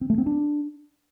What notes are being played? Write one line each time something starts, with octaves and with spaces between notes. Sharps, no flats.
C4
A3
C4
D4